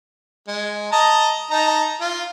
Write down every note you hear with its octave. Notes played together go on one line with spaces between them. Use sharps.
G#3
D#5 A5 A#5
D#4 A5 A#5
F4